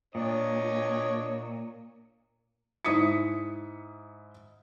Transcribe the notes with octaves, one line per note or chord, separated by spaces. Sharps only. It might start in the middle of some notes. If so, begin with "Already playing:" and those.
A#2 D4 C#5 D#5
G#2 E4 D#6 B6 C#7